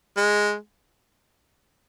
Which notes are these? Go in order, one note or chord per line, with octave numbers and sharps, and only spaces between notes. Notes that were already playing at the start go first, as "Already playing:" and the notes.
G#3